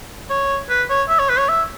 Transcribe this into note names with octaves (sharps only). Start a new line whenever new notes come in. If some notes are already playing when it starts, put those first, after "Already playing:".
C#5
B4
C#5
E5
C#5
B4
C#5
E5